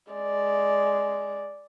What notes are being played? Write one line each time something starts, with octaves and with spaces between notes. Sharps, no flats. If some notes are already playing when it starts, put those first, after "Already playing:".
G#3 D5